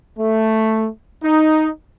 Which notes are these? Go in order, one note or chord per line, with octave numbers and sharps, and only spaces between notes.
A3
D#4